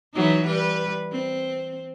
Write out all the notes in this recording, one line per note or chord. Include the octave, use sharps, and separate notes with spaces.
E3 F#3 D#4
G3 B4
C4